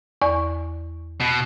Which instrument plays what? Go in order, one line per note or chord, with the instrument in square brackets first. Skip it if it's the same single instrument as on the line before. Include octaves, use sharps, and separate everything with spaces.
[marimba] E2 D5 C#6
[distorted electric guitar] B2